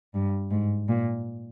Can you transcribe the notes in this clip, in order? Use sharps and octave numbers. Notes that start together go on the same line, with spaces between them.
G2
G#2
A#2